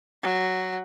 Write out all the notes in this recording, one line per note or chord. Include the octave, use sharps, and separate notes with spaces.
F#3